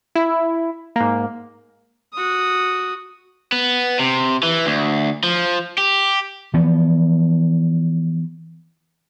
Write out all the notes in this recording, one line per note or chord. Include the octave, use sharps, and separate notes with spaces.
E4
G#2 A#3
F#4 D#6
B3
C3
E3
D2
F3
G4
E3 F3 B3